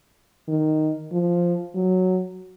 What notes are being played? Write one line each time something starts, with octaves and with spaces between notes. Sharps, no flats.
D#3
F3
F#3